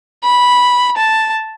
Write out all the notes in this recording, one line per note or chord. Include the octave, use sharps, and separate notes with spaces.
B5
A5